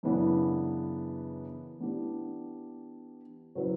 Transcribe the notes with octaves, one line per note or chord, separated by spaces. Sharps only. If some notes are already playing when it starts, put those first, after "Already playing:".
F#2 C#3 E3 B3 D4
E3 B3 D4 G4
C#3 F#3 C#4 E4 B4